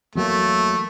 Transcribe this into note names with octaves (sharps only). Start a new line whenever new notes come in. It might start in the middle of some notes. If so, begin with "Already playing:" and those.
E2 F#3 A3 A#3